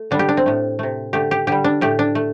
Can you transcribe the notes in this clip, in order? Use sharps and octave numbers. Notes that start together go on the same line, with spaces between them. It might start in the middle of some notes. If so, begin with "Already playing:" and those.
Already playing: A3
D3 G3 D4
G4
D4
C4
A2 A3
C3 A3
D3 A3 G4
G4
D3 G3 G4
D4
A2 A3 G4
D4
A3